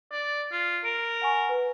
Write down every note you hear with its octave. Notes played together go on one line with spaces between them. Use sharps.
D5
F4
A#4 D7
F#5 G#5 C#6
B4